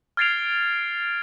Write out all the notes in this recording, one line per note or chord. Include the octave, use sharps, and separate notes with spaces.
F6 G#6 A6 C7 D7 F7